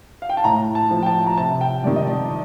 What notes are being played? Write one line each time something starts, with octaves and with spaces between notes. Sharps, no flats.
F5
G5
A5
A2 A#5
A5
F3
G5
A5
A#5
C3 A5
G5
D#3 G3 D5
D#5
D5